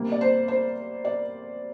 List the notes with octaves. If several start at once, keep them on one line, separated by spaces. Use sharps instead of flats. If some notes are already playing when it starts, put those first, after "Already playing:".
Already playing: C3 G3 A#3
D5
C5
C5
D5